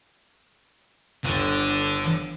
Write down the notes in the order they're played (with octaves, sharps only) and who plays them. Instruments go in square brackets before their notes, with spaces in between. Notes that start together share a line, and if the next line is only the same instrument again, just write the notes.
[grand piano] G1 [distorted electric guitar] D3